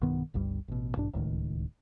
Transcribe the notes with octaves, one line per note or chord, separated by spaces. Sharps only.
B1 G2 D#3 B3
G1 C#2 G2 G3
A1 B2
A1 G2 B2 D4
D1 C#2 A2 D#3